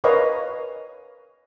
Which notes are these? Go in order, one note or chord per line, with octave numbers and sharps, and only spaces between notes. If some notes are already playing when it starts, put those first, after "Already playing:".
A#4 B4 C#5 D#5 F5